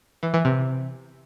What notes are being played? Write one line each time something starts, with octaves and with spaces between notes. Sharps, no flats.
E3
E3
C3